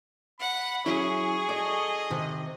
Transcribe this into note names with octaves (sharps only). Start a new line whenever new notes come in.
F#5 B5
F#3 C#4 E4 G#4 C#6
A4 D5 D#5
C3 D#3